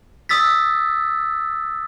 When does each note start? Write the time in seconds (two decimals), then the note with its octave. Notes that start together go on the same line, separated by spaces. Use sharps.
0.29 D#6 E6 A6 B6